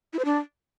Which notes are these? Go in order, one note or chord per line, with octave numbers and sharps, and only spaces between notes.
E4
C5
D4